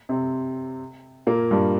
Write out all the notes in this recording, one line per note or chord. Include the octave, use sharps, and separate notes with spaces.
C3 C4
A#2 A#3
G2 G3